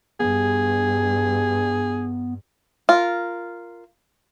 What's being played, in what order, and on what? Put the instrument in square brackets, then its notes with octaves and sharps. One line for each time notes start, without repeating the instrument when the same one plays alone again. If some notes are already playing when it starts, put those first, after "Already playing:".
[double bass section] G2 [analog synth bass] B3 [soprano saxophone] G#4
[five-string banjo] F4 A#4